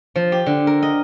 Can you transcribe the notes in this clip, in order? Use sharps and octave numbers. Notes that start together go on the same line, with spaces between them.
F3
G4
D3
A#4
D#5